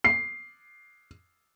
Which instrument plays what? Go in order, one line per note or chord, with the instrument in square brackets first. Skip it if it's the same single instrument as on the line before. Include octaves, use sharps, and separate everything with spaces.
[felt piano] C7